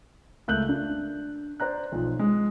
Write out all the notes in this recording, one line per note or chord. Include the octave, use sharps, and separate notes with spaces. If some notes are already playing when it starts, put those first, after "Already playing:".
C#2 A3 A#4 F#6 G6 F#7
D4
C5 D5 A#5 F#6
B1 F3
G#3